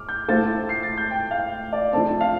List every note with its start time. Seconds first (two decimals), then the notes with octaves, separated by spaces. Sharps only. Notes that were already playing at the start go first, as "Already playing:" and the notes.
Already playing: D6 F6
0.09 G6
0.28 A2 A3 F4 A4 C5 A6
0.69 C7
0.83 A6
0.97 G6
1.10 G5
1.31 F5
1.73 D5
1.93 F3 A3 C4 A5
2.07 A5
2.21 F5